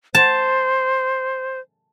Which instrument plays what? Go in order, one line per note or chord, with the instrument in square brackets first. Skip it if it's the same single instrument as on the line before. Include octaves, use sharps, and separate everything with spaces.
[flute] C5 [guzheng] A5